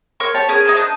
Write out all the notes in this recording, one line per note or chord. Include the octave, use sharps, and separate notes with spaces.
A#4 C#5 C6 C#6
G4 C#5 A5
C#4 G#4 A#4
D#4 G#4 A#4 C5
D4 D#5 G6